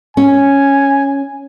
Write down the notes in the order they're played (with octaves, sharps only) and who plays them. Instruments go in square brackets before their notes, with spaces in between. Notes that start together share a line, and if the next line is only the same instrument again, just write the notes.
[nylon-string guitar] C#4 [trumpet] G#5